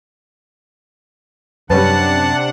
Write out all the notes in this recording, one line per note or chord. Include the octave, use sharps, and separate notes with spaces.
F#2 C3 G3 C#4 D4 B4 F#5 A5